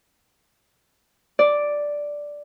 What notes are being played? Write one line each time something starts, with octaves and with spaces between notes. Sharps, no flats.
D5